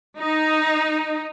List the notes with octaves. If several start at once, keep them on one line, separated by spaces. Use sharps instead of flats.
D#4